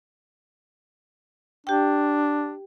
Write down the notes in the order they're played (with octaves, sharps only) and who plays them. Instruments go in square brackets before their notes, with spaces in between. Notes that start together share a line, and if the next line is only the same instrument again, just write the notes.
[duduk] D4 [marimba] G4 G5